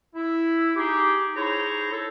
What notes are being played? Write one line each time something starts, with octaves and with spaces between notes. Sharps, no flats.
E4
D#4 G4 G#4
D#4 E4 G#4 C5 C#5 A#5
A4